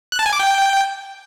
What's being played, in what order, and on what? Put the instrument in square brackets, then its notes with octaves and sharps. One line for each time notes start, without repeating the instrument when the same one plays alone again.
[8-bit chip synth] F#6
A5
G#5
D6
G5